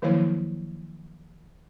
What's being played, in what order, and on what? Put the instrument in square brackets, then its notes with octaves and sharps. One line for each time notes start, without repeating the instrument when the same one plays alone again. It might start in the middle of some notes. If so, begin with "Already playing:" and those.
[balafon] D#3 F3 F#3 A#3 E4 C#5